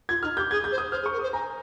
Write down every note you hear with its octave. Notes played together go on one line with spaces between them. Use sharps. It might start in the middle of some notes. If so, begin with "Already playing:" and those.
F4 G#6
D#4 F6
G4 G6
G#4 G#6
G6
C5
D#6
C5 F6
G#4
C#6
A#4
C5 D#6
G#5 A#5